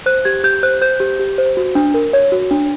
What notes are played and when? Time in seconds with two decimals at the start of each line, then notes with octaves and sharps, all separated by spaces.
0.06 C5 F#6
0.25 G4 G#6
0.44 G4 G6
0.63 C5 F#6
0.82 C5 G6
1.00 G4
1.19 G4
1.38 C5
1.57 F#4
1.75 D4
1.94 A#4
2.13 C#5
2.32 F#4
2.51 D4